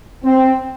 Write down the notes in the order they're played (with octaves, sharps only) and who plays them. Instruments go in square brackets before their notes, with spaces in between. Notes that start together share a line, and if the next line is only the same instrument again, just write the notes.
[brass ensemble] C4